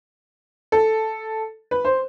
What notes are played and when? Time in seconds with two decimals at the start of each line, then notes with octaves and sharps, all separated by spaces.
0.72 A4
1.71 B4
1.85 C5